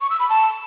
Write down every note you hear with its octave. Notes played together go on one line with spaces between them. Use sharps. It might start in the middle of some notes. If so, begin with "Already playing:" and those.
C#6
E6
B5
A5